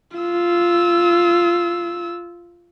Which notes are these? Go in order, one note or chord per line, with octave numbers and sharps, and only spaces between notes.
F4 E6